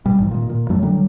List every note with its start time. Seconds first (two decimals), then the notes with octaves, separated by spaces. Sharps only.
0.06 B2 G3
0.19 G#1 G#2 E3
0.31 A#2 D#3
0.50 A#2
0.69 F2 F#3 G3 A3
0.83 D3 F#3 G3